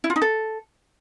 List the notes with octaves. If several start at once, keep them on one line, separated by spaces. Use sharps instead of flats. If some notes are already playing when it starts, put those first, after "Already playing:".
E4
F4
D#4
A4